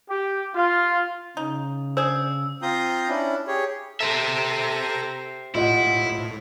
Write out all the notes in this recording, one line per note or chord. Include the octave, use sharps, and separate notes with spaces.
G4
F4
C#3 D#4
D4 G#4 C5 E6
C4 F4 A#5 D#6 G6
C#4 D4 E4
G4 G#4 C#5
G4 A4 C5 E5 A#5 A#6
A2 E4 F4 D#5 F#5